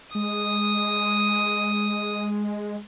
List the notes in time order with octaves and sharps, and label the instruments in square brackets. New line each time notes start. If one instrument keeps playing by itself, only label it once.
[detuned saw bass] G#3 [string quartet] D#6